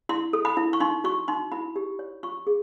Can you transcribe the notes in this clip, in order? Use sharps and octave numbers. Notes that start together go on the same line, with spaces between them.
E4 C6
A4
B5
E4
C#6
D#4 C6
F#4 C#6
D#4 C6
E4 B5
G4
C#5
F4 C#6
G#4